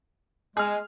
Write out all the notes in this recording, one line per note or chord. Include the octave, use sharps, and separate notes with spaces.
G#3 G#4 F6